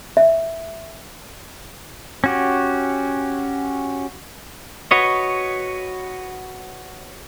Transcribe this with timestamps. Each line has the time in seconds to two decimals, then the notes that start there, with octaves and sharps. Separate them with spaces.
0.17 E5
2.24 C#4 F#4 G4
4.91 F#4 B4 C#5 D#5